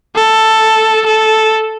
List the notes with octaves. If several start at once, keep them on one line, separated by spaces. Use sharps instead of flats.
A4
A4